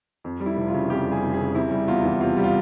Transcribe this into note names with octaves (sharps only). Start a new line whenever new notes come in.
F2
G3
E4
F1
F4
C#3
F2 G4
G3
G#4
F1
G#4
C#3
C3 E4
G3
E2 F4
E3
C3 F4
G3
F4